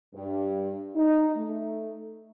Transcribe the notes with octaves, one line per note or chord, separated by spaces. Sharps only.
G2
D#4
A3